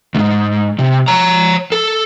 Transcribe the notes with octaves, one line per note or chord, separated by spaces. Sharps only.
D2 G#2
C3
C#5 A#5
A4